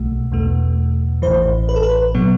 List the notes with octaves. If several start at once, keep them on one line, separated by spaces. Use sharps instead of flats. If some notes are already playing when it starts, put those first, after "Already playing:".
Already playing: B1 B2 A3
E2 B2 A3
A1 A2 E3 C5
B4
A4
B4
B2 F#3 B3